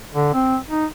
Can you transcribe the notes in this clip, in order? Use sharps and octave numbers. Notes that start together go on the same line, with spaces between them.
D3
C4
D#4